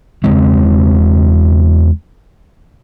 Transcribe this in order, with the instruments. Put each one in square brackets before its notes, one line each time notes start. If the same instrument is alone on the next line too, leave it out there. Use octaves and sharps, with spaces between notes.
[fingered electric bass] E2 C#3 G#3 C4